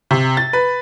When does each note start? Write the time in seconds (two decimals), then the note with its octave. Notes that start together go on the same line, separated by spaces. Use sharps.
0.11 C3
0.37 A6
0.53 B4